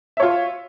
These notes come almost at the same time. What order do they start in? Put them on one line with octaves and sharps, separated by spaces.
E5 C#5 F4